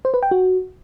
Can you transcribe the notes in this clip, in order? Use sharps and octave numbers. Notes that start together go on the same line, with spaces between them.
C5
B4
G5
F#4